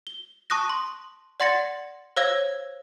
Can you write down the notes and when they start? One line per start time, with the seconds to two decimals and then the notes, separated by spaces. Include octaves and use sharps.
0.07 G7
0.50 A5 C#6 D#6 F#6 A#6
0.69 C6
1.40 D5 F#5 C6 A6 A#6 C#7
2.16 C5 C#5 F5 E6 G#6 A#6